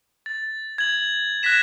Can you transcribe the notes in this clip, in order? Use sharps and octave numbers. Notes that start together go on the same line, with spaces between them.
A6
G#6 F#7
F#6 G#6 A#6 B6 E7